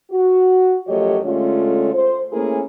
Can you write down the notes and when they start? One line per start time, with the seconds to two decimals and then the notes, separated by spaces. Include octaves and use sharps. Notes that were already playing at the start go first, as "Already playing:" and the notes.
0.11 F#4
0.88 F#2 F3 A3 G4 C#5 D#5
1.25 D3 G#3 A3 C#4 F4
1.93 C5
2.32 A3 A#3 C#4 E4 G#4 A#4